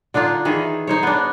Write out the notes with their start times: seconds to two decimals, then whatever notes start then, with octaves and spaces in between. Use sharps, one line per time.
0.14 D3 D4 D#4 F4
0.45 D#3 E3 G#4
0.87 D#4 C5 C#5
1.03 B3 D4